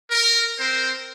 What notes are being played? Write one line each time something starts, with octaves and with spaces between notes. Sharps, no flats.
A#4
C4 A#4 C5